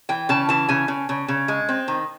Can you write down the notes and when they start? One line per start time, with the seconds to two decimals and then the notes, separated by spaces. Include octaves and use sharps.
0.09 E3 G5
0.29 C#3 A5
0.49 E3 A5
0.69 C#3 G#5
0.88 C#3
1.09 C#3
1.28 C#3
1.48 G#3
1.69 C4
1.88 D#3